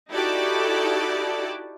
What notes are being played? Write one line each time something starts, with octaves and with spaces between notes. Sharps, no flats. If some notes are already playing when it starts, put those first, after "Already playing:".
D#4 E4 F#4 G4 A4 D5